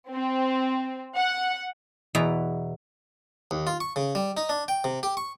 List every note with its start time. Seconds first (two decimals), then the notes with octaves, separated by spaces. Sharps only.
0.11 C4
1.17 F#5
2.15 E2 B2 E4 A#5
3.51 D#2
3.67 F4
3.80 C#6
3.96 C#3
4.15 G3
4.37 D#4
4.49 D4
4.68 G5
4.84 C3
5.03 G4
5.17 C#6